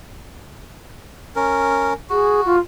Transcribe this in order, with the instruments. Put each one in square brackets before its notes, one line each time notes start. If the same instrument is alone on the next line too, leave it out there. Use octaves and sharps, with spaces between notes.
[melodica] C#4 A#4
[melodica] F#4 [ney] G#4
[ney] F4